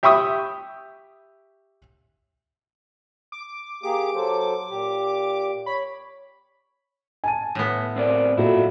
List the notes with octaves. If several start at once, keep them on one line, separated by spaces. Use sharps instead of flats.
G4 E5 G5 B5 C#6 D#6
D6
A#3 G4 G#4 D6
F#3 A4 C5
A#2 G4
C#5 B5
G#5 A5 D#7
A2 B3
C4 A#4 D5
A#2 F#3 E4 F#4 A4